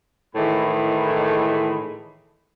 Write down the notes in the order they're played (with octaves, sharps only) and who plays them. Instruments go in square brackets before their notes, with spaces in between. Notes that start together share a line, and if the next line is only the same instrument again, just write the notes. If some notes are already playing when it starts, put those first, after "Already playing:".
[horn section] A2 D#3 E3 G#3 B5